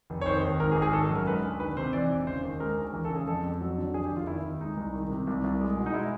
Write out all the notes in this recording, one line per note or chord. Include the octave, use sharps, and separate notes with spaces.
F1
C#5
D#3 C5
D#2
G#1 A#4
G#4
G#1
G#4
D#3 A4
A4
F#2
A#4
G#3 B4
D2
D#3 B4
C3 C5
E3 D5
E1
C#3 C5
D#2
G#3 A#4
D2
E3 A#4
A4
C#3
G#4
F2 A4
F2
F#3
D3
F1 G#4
G4
F1
F4
D#3 E4
D#2
G#3 D#4
C2
D#3
C3
C2
C2
G#3
B2
D#4
G#3 E4